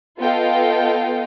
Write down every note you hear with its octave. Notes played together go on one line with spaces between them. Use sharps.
B3 F4 A4 D#5 F5 G5